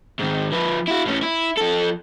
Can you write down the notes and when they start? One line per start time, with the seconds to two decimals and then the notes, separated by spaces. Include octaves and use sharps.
0.19 G#2 D#3
0.52 F3 B4
0.88 E4 F#4
1.06 A2 C#4
1.23 E4
1.57 F3 A4